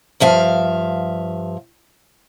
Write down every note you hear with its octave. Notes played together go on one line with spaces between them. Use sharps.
G2 F3 E5 F5